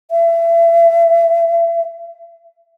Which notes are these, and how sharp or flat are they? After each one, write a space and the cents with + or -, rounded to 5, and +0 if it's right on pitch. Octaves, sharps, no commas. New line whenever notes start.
E5 +30